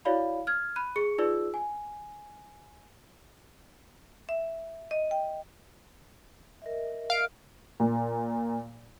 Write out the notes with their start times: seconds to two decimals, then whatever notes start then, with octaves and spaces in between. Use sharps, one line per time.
0.05 E4 F#4 C#5 D5 F5 B5
0.47 F6 G#6
0.76 B5 F#6 D#7
0.96 G#4 C#6 C#7
1.18 D#4 F4 G#4 B4 D5 E6
1.54 G#5
4.29 E5
4.91 D#5
5.11 G5
6.62 A#4 D#5 E5
7.10 F5 D7
7.80 A#2